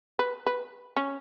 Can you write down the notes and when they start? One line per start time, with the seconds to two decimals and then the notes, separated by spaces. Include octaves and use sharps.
0.19 B4
0.46 B4
0.96 C#4